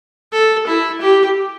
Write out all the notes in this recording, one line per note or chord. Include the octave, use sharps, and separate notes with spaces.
A4
E4
G4